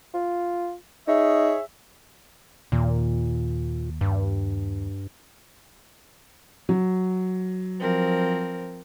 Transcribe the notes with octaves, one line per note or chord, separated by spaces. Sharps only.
F4
D#4 G#4 C#5 E5
D#2 A#2
G2
F#3
F3 C4 A#4